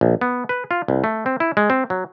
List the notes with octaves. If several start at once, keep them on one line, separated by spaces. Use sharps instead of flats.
A#1
B3
B4
F4
C2
A3
C4
E4
G#3
C4
F#3